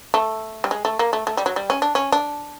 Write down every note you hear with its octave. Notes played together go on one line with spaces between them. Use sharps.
A3
G3
G#3
A3
A#3
A3
A3
G3
F#3
G3
C#4
D4
C#4
D4